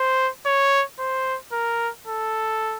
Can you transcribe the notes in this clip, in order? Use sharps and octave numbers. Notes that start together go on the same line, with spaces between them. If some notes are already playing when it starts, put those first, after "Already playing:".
Already playing: C5
C#5
C5
A#4
A4